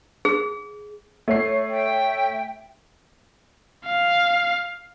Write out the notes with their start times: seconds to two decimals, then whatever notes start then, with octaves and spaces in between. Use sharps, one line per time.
0.25 G#4
1.28 A3 C#5 C7
1.70 E5 G5
3.86 F5